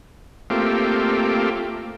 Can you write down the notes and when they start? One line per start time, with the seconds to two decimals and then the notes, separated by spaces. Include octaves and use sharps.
0.50 A3 A#3 C4 F4 G4